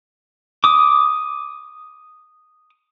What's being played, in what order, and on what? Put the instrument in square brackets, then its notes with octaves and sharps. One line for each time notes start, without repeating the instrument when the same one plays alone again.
[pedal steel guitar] D6 D#6